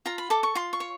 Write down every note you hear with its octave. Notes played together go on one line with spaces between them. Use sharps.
F4 A#5
B5
A4 D6
C#6
F4 C6
C#6
C#5